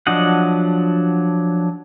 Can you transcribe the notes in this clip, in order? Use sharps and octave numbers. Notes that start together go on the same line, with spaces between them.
F3 F#3 D4 D#5 F#5